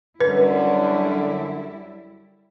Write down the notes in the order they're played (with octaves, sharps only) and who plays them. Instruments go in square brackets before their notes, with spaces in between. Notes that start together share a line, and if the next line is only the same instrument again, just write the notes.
[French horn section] F#2 D3 F#3 [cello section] G3 E4 [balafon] B4